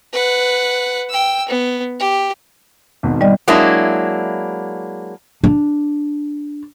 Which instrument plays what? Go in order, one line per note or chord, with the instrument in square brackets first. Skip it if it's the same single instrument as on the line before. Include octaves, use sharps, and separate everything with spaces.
[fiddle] B4 F#5
G5 E6
B3
G4
[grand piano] G#1 G#2 B2
[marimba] G3 D5 D#5
[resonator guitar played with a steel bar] F#3 G#3 A#3 D4 E4
[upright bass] D4